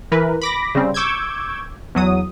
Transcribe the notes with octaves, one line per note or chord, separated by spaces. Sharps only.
E3 A#4 B4
B5 D6 A#6
C#3 G3 C4
C#6 D6 E6 G6 G#6
E2 F#3 D#6